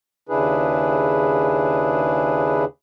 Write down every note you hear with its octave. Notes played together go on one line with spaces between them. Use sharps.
D#2 C#3 D4 E4 G#4 B4